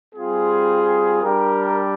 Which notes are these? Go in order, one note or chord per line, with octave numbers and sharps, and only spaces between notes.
G3 C4 F4 G#4
G3 D4 G4 A#4